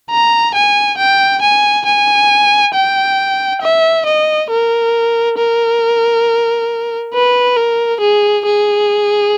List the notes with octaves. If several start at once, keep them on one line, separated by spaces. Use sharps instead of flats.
A#5
G#5
G5
G#5
G#5
G5
E5
D#5
A#4
A#4
B4
A#4
G#4
G#4